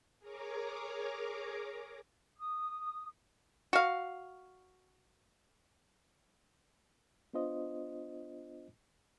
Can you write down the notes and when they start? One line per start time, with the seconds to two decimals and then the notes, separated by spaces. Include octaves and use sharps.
0.20 G#4 A#4 C#5 A#5 D6
2.39 D#6
3.73 F#4 F5
7.33 B3 D4 F4 C5 D#5